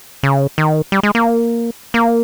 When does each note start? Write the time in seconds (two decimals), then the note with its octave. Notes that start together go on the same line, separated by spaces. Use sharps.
0.23 C#3
0.58 D#3
0.92 G3
1.03 G#3
1.15 A#3
1.94 A#3